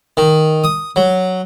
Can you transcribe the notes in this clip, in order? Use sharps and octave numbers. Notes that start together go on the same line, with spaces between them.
D#3
D#6
F#3